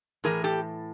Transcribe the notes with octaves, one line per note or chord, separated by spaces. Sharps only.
A2 E3 G#4 A#4
G4 A4